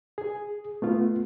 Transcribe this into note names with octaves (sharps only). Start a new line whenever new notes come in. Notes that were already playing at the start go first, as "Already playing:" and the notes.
G#4
A3 B3 F4